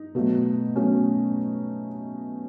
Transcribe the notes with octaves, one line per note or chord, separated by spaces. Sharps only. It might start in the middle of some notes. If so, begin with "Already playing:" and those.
Already playing: D#4
B2 F#3 A3
B2 F#3 A3 C#4